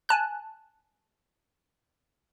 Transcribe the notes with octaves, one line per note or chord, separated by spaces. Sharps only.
G#5 A5 F#6